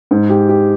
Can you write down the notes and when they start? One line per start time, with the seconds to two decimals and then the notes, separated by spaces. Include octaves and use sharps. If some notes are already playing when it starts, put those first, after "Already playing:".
0.11 G#2
0.30 G4
0.49 G4